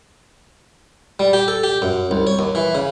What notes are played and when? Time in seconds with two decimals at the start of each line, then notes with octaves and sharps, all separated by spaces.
1.20 G3
1.33 G4
1.48 A4
1.63 G4
1.82 F#2
2.11 C2
2.27 C#5
2.39 D#2
2.55 E3
2.75 C#3